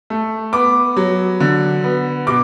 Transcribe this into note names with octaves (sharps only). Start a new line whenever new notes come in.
A3
B3 D6
F#3
D3
B3
B2 D6